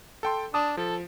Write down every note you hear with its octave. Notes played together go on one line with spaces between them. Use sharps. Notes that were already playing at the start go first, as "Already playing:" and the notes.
A4 G5 C6
D4 A5 D6 D#6
F3 A4